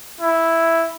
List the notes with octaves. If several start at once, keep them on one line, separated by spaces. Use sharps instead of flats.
E4